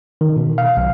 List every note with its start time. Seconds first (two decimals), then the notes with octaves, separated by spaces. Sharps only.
0.21 D#3
0.36 B2
0.58 F5
0.77 B1